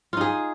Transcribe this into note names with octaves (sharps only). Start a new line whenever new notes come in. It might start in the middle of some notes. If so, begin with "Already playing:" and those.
D#4 F4 G#4